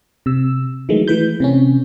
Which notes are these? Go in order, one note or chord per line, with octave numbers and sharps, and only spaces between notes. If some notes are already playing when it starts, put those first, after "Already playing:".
C3 E6
D#3 E3 F#3 G#3 A3
E3 A3 B4 B5 G6
C3 C4 C#4